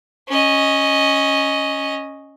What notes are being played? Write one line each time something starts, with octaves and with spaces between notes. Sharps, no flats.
C#4 D#5